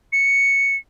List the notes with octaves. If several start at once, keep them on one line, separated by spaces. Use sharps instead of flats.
C#7